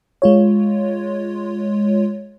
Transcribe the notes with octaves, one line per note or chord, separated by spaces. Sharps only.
G#3 F4 C#5